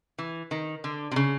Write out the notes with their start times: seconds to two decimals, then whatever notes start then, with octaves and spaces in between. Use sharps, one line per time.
0.19 E3
0.51 D#3
0.84 D3
1.12 C3
1.16 C#3